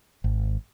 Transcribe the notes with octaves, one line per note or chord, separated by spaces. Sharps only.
G#1